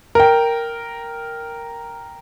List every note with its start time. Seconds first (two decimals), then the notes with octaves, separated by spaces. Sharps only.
0.15 A#4 G5